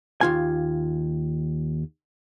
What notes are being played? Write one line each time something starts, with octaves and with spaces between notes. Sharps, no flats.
D#2 F4 G#5